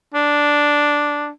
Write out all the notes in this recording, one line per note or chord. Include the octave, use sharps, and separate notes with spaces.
D4